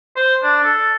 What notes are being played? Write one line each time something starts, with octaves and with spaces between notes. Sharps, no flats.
C5
D4
A4